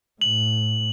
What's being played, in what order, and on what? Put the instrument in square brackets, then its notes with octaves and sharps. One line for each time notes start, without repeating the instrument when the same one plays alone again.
[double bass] A2 [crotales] F#7